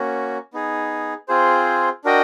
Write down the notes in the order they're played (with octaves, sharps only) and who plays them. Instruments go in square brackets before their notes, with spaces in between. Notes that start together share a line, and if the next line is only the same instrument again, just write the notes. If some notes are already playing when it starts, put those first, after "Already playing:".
Already playing: [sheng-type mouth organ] A#3 C#4 F#4
B3 D#4 G#4
C4 F4 G#4 C5
D4 F#4 A#4 D#5 G5